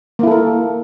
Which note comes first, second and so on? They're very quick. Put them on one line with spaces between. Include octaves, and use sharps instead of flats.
A#3 E4 A4 A#4